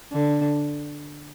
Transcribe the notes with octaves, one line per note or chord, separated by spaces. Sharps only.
D3